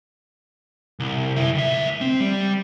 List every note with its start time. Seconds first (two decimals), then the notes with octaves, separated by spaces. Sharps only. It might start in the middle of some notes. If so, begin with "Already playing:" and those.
1.00 C2
1.36 F#2 E4
1.54 C#2 E5
2.01 C4
2.20 G3